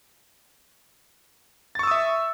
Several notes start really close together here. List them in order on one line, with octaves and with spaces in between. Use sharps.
A6 C#6 E6 D#6 E5